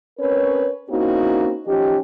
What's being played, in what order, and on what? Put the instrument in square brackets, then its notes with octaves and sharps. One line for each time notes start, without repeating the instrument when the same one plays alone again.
[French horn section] C4 C#4 A#4 B4 C#5
A#3 C4 C#4 D#4 E4 F#4
F3 C#4 D#4 G4